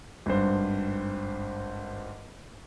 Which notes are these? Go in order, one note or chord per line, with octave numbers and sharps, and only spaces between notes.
G#1 G2 C5